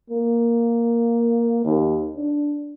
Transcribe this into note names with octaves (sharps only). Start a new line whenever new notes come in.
A#3
D#2
D4